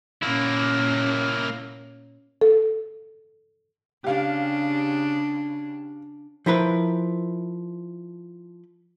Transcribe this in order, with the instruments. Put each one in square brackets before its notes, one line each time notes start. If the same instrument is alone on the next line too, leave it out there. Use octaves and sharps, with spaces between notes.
[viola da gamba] A#2 C#4 [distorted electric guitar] A#3 E4
[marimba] A4
[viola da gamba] C#3 D4 [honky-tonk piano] G4 F5
[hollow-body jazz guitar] F3 E4 A#4 B4